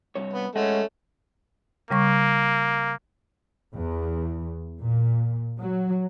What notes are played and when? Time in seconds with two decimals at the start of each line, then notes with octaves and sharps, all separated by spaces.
0.16 C2 G2 C#5
0.33 B3
0.56 G#3 A3 C#4 D#5 F#5
1.90 C#3 G3 A#3 C#6
3.73 E2
4.80 A#2
5.59 F#3